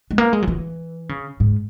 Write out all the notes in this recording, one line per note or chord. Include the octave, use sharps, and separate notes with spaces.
G#3
A#3
G#3
F#3
E3
C#3
G#2